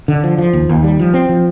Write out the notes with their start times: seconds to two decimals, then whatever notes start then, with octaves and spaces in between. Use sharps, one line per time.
0.08 D3
0.24 F3
0.38 F3
0.53 D#2
0.69 D#2
0.84 G3
0.99 F3
1.14 C4
1.29 F3